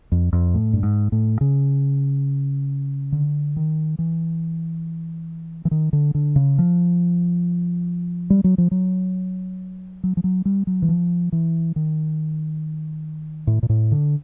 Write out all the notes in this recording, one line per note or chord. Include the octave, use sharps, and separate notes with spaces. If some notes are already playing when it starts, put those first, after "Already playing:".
F2
F2
A2
G2
G#2
A2
C#3
D3
D#3
E3
E3
D#3
D3
D3
C#3
F3
G3
F#3
F3
F#3
F#3
F3
F#3
G3
F#3
E3
F3
E3
D#3
A2
A#2
A2
D3